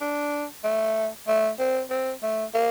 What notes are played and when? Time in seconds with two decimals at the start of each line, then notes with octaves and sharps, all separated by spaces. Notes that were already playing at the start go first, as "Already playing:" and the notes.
0.01 D4
0.64 A3
1.28 A3
1.59 C4
1.90 C4
2.23 A3
2.54 A#3